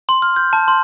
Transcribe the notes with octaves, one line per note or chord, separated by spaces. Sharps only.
C6
F6
G6
A5
C6